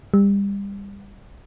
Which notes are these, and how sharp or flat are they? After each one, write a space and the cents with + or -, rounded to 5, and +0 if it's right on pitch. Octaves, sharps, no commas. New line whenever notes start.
G3 +30